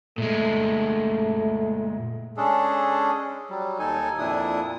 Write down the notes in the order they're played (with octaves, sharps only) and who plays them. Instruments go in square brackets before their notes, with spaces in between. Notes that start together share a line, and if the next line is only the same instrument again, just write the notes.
[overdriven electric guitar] A#2 G#3 [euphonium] A3
[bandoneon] G#3 C#4 D4 G#4 A4
F#3 G3
D#2 D#4 A4 G#5
F2 A#2 D4 E4 D#6